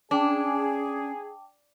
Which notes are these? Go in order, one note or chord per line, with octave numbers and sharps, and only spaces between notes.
C#4 D4 G#4 G5 A5 D6